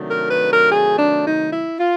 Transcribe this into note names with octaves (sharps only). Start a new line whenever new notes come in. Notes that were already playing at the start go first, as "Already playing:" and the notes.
Already playing: C3 D#3 F#3 A3 D4
A#4
B4
A#4
G#4
D4
D#4
E4
F4